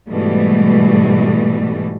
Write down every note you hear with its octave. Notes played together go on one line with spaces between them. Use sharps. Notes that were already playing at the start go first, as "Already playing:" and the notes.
G#2 B2 E3 G3 A3